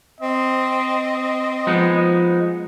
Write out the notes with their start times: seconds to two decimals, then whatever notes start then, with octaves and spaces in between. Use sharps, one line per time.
0.21 C4 D#5
1.67 F3 G#3 B3 D#4